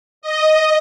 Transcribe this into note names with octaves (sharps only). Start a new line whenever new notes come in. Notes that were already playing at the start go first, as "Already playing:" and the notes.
D#5